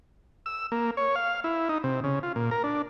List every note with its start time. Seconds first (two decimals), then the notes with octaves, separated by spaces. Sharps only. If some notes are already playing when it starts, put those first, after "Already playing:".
0.46 E6
0.72 A#3
0.97 C#5
1.16 F5
1.44 E4
1.69 D#4
1.84 C3
2.04 C#3
2.23 F4
2.36 A#2
2.51 A#4
2.64 D4